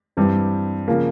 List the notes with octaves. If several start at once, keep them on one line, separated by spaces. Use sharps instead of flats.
G2 E3 G3 C4 G4
C#3 F3 A#3